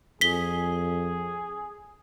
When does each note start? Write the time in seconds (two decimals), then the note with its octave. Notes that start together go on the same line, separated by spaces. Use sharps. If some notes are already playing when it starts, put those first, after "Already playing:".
0.21 F2 G#4 B6 G7